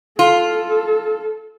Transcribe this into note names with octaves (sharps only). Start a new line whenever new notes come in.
F4 A4